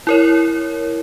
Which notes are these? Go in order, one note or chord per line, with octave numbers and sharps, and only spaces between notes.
E4 A#4 C#5